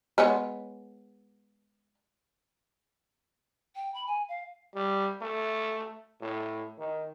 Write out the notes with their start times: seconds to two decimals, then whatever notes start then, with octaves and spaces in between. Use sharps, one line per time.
0.18 G#3 B3 C#5
3.75 G5
3.94 B5
4.07 G#5
4.29 F5
4.75 G3
5.22 A3
6.21 A2
6.79 D#3